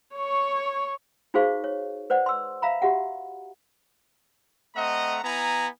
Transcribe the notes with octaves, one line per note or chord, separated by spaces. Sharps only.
C#5 C#6
D#4 F#4 G#4 C5 F5 C#6
C#5
B4 C5 D5 F#5
C6 E6
E5 F5 A#5 B5
F#4 G4 E5 F#5
A3 C4 D#5 F#5 A#5
B3 E4 G#5 A#5